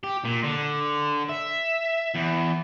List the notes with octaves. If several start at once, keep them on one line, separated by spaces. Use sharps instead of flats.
G4
A#2
D3
E5
E2